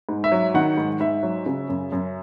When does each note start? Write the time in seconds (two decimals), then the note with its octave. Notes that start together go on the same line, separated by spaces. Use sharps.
0.09 G#2
0.24 E5
0.32 F#3
0.54 D#3 F#5
0.77 G#2
1.00 G#2 E5
1.23 F#3
1.46 C#3
1.69 F#2
1.92 F#2